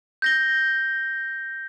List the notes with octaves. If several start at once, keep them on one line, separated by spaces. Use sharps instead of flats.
G6 A#6 G7